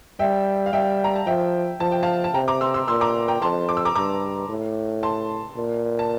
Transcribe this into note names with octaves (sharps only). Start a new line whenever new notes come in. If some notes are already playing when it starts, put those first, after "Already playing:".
G3 E5 G5
F5
G3 E5 G5
A#5
A5
F3 E5 G5
F3 A5
G5
F5 A5
A5
C3 G5 A#5
A#5 D6
C6 E6
C6 E6
A#2 C6 E6
A#5 D6
G5 A#5
F2 A5 C6
D6
E6
A#5 D6
G2 A#5 D6
A2
A5 C6
A#2
A5